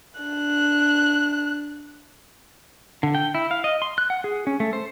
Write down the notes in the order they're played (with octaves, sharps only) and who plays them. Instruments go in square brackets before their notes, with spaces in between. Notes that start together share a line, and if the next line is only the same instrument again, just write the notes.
[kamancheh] D4 F#6
[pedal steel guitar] D3
G5
E4
F5
D#5
C6
F#6
F#5
G#4
C#4
A3
C5